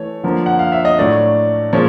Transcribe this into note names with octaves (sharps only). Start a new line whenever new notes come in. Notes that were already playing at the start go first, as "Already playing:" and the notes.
Already playing: E3 A3 C#5
D3 F3 A#3
F#5
F5
E5
D#5
A2 F#3 A3 D4 D5
A#2 F3 G#3 C#4